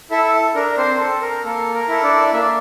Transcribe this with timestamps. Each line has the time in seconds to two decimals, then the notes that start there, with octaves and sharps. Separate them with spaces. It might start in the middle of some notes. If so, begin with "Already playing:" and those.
0.11 E4 A4 E5
0.55 D4 A#4
0.77 C4 C5
1.00 A4
1.22 A#4
1.44 A#3 A4
1.74 A#4
1.88 E4 A4
2.03 D4 D5
2.33 A#3 E5
2.41 D5